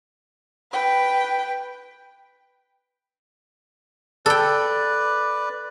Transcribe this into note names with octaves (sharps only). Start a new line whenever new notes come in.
B4 G5
A4 B4 D5 G5